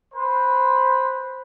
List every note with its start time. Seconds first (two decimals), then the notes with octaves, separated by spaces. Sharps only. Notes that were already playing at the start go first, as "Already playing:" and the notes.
0.14 B4 C5